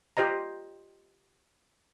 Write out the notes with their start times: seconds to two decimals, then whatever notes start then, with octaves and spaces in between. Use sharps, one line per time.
0.17 F4 G4 C5 D#5 A#5